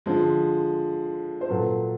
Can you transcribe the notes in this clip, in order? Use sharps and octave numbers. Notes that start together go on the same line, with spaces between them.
D3 F3 G#3
C5
A#2 F#3 A4 B4